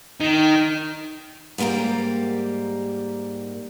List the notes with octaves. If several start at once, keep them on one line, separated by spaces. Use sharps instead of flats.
D#3
G#2 G3 A#3 G4 A#4